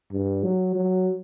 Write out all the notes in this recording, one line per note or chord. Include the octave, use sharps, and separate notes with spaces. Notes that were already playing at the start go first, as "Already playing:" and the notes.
G2
F#3
F#3